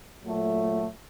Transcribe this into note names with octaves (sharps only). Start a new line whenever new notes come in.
A#2 F#3 A3